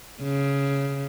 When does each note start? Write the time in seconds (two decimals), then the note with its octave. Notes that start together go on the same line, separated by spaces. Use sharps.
0.22 C#3